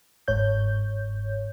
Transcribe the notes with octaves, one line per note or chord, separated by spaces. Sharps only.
G1 G#2 C#5 G6